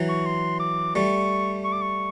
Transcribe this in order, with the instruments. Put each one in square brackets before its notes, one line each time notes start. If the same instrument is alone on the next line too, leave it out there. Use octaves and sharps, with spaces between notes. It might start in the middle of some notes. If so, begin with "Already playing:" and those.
Already playing: [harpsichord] E3 F#3
[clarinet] C#6
C6
D6
[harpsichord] G3 A3 [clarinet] C#6
[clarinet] C#6
D6
C#6